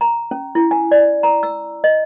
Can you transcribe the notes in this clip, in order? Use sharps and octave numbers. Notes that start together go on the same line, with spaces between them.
A#5
C#4
E4
G#5
D5
A#5
E6
D#5